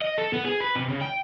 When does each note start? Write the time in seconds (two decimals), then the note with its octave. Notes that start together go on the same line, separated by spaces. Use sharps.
0.02 D#5
0.18 A4
0.33 B3
0.45 G#4
0.60 B4
0.75 C3
0.89 C#3
1.01 G5